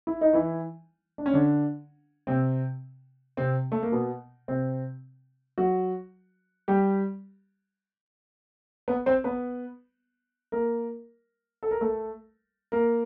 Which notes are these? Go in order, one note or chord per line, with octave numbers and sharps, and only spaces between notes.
E4
D#4
E3 E4
D4
C#4
D3 D4
C3 C4
C3 C4
A3
A#3
B2 B3
C3 C4
F#3 F#4
G3 G4
B3 B4
C4 C5
B3 B4
A#3 A#4
A4
A#4
A3 A4
A#3 A#4